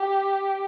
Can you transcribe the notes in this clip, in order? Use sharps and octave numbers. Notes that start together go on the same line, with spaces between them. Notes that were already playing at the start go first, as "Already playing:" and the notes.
Already playing: G4